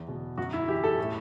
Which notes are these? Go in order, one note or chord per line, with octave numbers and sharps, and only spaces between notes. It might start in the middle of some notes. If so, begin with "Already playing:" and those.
Already playing: E2
B2
F#2 F#4
E4
E3 G4
A4
A2